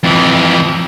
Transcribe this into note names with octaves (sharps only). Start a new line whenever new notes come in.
F2 E3